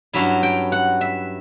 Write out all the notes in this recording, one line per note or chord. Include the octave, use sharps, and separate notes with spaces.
G2 F#3 C#4 E4 E5
G5
F#5
E5